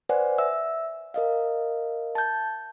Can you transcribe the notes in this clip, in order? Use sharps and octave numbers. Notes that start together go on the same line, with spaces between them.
B4 C5 D5 F#5 G#5
E5 E6
A#4 D#5 F5
A5 G6